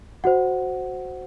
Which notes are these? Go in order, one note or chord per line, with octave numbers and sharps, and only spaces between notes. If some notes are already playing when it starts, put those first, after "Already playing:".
F#4 C5 F#5